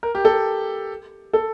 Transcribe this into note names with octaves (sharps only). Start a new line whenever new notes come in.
A#4
G4
A4
A4